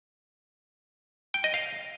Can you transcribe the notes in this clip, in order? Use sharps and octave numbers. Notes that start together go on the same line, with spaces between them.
G5
D#5
F5